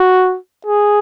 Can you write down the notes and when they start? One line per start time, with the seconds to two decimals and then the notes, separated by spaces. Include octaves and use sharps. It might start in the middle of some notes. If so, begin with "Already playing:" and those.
Already playing: F#4
0.66 G#4